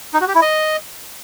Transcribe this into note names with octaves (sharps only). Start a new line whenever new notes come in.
D#4
F#4
G4
E4
D#5